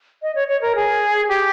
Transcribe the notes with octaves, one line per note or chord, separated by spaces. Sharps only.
D#5
C#5
C#5
A#4
G#4
G4